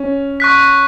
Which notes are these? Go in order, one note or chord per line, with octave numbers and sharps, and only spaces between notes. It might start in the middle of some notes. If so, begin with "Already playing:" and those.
Already playing: C#4
C#6 F#6 B6